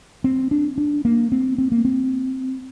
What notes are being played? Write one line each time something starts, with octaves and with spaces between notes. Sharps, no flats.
C4
D4
D4
A#3
C4
C4
A#3
C4